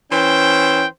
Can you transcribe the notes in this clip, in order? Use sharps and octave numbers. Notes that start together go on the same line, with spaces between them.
E3 C#4 C5 G5